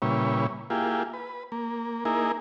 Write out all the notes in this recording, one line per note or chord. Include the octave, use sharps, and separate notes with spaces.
A#2 C#3 G3 E4 B4 C#5
A#3 E4 F4 G4 G#4
B4
A#3
A#3 D#4 E4 G#4 A#4